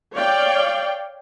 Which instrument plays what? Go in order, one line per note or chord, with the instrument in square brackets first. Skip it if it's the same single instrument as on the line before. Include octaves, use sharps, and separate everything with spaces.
[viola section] C#5 D5 F5 G5